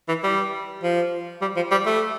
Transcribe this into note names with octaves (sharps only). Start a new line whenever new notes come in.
E3
G3
F3
G3
F3
G3
A3